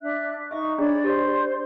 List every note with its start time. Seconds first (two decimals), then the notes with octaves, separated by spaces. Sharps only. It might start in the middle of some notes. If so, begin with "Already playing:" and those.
0.01 D4 E5 F#6
0.51 D#4 D#5 E5 C#6
0.78 D4 G#4 C#5 D5 B5
1.04 G4 A#4 C5 D5